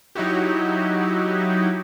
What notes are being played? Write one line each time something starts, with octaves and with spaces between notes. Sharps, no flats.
F#3 D#4 E4 F#4 G4